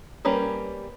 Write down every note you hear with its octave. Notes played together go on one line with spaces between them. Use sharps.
G3 A#3 C#4 A#4 B4